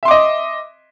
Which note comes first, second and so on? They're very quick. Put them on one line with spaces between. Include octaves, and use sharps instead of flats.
E5 C6 D6 D#5